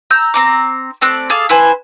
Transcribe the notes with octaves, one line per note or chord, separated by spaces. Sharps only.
A#5 E6 G6
C4 A#5 D6
A3 C4 D5 F#6
G#4 A4 F5 D6
E4 B4 C5 G#5